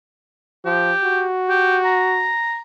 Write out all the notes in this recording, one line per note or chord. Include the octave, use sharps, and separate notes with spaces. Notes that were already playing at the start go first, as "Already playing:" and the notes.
F3 G4
F#4
G4
A#5